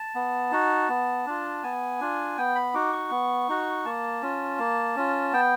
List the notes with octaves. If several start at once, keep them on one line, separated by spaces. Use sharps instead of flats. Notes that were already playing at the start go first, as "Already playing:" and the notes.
Already playing: A5
B3
D#4 F#4
B3
D4 F4
B3 G#5
D4 F4
B3 G5
B5
D#4 F#4 D6
C#6
B3
D#4 F#4
A#3 A5
C#4 F4
A#3
C#4 F4
B3 G5